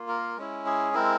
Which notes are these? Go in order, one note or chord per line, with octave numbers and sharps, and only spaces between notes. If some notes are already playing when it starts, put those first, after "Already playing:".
Already playing: A#3 F4
A#4
G#3 C#4 E4
G#4
G#3 C4 E4 A#4